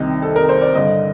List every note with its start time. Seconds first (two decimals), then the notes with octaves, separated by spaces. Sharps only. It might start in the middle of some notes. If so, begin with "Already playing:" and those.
Already playing: C2 C3 D#3 D#5
0.22 A4
0.36 A#4
0.49 C5
0.61 D5
0.75 G2 D3 D#5